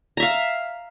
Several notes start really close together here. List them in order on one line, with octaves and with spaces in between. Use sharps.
A#5 E5 F5